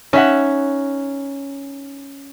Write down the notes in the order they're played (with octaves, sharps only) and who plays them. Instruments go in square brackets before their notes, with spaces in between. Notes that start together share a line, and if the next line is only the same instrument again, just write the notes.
[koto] C#4 [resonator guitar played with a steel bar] D#4 E5 F#5